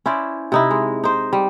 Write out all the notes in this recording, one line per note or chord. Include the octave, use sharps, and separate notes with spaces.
C#4 E4 C5 D5
C3 D#4 E4
G#3
D#4 C5
G3